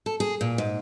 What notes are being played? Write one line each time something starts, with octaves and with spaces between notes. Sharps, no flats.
A4
G#4
A#2
G#2